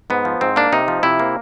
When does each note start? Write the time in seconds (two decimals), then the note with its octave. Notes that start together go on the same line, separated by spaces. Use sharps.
0.10 G#2 B3
0.25 F3
0.41 G#2 C4
0.56 A#3 D4
0.72 C3 D#4
0.88 F3
1.03 C3 E4
1.19 A#3